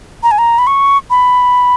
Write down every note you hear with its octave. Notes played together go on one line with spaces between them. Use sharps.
A#5
G#5
A#5
B5
C#6
B5